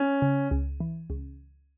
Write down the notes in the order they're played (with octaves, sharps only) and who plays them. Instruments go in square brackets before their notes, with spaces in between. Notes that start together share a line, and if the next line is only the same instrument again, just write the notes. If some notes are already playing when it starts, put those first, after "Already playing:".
Already playing: [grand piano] C#4
[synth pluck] C#3
C#2
E3
C#2